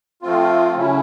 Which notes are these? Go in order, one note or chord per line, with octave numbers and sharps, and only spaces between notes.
F3 A3 C4 F4
C#3 F#3 A3 C#4 E4